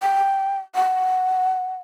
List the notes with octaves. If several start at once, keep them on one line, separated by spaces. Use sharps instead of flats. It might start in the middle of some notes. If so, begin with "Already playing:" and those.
G5
F#5